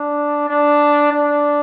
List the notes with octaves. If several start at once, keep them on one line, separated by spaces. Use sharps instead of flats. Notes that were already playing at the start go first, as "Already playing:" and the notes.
Already playing: D4
D4
D4